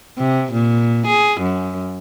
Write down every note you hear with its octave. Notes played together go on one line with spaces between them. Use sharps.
C3
A#2
G#4
F#2